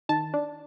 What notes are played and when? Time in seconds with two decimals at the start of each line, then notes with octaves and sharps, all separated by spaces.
0.09 D#3 A5
0.34 D4